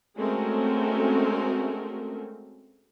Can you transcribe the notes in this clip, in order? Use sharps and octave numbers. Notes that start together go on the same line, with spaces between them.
G#3 A3 C4 C#4 F#4 A#4